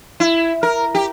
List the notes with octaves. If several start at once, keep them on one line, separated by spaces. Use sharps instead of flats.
E4
A#4
G4